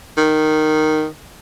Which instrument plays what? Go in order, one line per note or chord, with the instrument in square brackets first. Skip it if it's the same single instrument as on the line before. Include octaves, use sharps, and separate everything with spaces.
[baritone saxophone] D#3